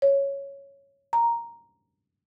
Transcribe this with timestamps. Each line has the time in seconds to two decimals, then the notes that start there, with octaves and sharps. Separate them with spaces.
0.02 C#5
1.13 A#5